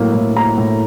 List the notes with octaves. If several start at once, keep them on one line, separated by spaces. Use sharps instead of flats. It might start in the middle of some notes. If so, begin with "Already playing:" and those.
Already playing: A2 F#3 A#3
A2
A#3 A#5
A2